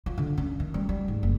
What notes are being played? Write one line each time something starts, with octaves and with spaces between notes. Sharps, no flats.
F4
D3
C#4
D#3
G3
G3
G#2
F#1